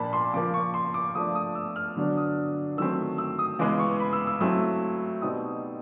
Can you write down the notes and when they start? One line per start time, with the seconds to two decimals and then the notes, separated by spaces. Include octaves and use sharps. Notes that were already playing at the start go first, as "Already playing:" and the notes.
Already playing: A#2 F3 A#3 D4 A5 B5
0.13 C6
0.34 C#3 F3 A#3 D6
0.54 C#6
0.74 C6
0.94 D6
1.15 F3 A3 D4 D#6
1.35 D#6
1.55 E6
1.76 F6
1.97 D3 F#3 B3 D4
2.17 D#6
2.77 D#3 F#3 A3 C4 E6
3.18 E6
3.39 D#6
3.59 C#3 E3 G#3 B3 D6
3.79 C#6
4.00 B5
4.13 E6
4.27 E6
4.41 F#3 A3 C4 E4 E6
5.22 B2 G3 C4 D#4 D#6